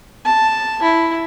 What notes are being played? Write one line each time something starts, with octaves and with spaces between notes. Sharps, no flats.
A5
E4